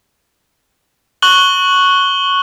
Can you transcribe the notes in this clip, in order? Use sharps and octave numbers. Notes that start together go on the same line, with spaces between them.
C#6 F#6 F#7 G7